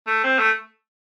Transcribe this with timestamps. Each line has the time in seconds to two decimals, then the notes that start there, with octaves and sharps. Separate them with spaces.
0.07 A3
0.24 C4
0.39 A3